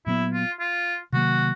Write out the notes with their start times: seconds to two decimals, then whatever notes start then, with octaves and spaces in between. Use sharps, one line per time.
0.06 A#2 F#3 B3 E4
0.33 F4
0.60 F4
1.12 C3 D#3 F#3 A#3 F#4